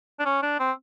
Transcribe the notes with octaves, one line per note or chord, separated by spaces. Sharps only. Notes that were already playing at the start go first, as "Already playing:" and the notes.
D4
C#4
D4
C4